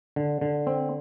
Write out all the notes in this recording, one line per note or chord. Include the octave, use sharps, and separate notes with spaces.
D3
D3
C4